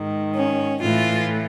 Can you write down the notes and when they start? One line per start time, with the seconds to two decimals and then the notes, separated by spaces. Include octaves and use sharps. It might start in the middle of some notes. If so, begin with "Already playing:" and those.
Already playing: G#2 D#3
0.35 C#4
0.82 A2 E3 F4